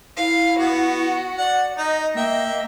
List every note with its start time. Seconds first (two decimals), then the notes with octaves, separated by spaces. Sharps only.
0.17 E4 F5
0.58 B3 F#4
1.38 D5 F#5
1.78 D#4 D#5
2.17 A#3 E5 G5